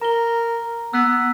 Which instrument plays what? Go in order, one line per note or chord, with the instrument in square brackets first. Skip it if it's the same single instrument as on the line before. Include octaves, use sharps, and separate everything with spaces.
[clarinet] A#4 [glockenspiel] A#5 G7
[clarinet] B3 [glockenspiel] E6 F#6 B6
[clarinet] B3